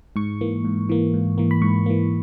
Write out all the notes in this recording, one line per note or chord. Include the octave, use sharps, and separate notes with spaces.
G#2 C#6
E3 A#3
G#2
E3 A#3
G#2
E3 A#3
B5
G#2 C#6
E3 A#3